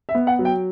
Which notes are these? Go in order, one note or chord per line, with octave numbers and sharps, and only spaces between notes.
E5
B3
F#5
F#3
G5